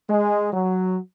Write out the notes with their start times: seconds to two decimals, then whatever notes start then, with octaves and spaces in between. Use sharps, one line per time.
0.10 G#3
0.53 F#3